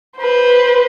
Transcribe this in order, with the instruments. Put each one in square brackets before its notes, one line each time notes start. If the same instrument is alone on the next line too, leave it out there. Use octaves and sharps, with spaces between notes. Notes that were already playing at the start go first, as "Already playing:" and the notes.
[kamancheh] B4 C5